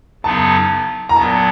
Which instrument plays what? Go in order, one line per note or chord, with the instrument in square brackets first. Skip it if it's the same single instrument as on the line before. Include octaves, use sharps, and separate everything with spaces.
[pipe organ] F#2 C#3 F#3 B3 D#4 [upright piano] A5
[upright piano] A#5
[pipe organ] A#2 F#3 B3 [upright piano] A5